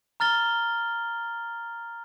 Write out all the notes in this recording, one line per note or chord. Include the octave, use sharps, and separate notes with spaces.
A#5 F6 A6 G7